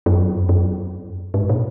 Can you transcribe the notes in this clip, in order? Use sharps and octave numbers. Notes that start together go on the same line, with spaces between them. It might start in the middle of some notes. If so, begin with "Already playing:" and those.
F#2
F#2
G#2
A#2